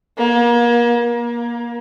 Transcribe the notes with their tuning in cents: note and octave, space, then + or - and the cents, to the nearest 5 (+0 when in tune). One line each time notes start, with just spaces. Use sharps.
A#3 +35
A#3 +25